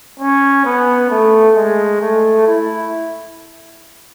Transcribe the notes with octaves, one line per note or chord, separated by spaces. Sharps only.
C#4
B3
A3
G#3
A3
E4